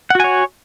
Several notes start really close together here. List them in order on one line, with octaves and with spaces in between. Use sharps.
F#5 F#4 G#5 C#5